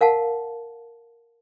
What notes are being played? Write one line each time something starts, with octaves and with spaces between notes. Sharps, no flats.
A#4 F5 F#5 A5